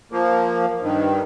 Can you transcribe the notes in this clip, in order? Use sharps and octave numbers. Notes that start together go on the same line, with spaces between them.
F3 A#3
G2 D#3